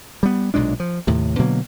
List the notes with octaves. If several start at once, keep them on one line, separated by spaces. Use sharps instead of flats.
G3 B3
B1 A#2 G#3 D4
F3
D#2 A2 C3
B2 D3 F#3 A#3